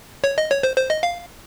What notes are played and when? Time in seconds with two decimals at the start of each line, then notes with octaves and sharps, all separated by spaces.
0.24 C#5
0.38 D#5
0.51 C#5
0.63 C5
0.77 C5
0.90 D#5
1.03 F5